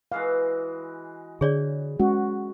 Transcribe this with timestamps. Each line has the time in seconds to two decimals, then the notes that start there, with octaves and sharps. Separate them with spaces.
0.12 E3 G#3 F#4 F5
1.41 D3 G#4 C#5 D5
2.00 G#3 C#4 F#4